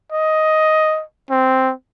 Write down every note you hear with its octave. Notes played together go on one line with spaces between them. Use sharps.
D#5
C4